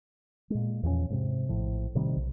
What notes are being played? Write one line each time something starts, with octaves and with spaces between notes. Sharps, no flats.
A#2 G#3
E2 F3 A#3 C#4
G#2 C3
A#1 A2 F3
A2 C3 D#3 G3
B1